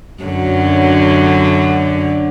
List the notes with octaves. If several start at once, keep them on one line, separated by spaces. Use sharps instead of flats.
F#2 D3 F#3